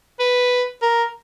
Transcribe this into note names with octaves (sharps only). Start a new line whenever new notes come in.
B4
A#4